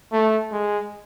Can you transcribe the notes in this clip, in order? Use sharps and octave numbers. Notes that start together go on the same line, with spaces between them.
A3
G#3